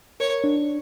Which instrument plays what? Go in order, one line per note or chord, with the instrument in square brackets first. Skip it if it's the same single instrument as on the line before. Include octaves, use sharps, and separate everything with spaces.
[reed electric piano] A#4 [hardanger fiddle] C#5
[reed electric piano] D4